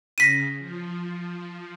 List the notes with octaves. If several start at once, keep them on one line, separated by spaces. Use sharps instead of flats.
C#3 A#6 B6 D#7
F3